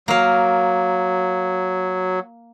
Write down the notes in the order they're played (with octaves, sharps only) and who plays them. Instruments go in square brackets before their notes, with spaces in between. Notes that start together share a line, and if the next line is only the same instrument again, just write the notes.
[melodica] F#3 [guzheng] A#3 F5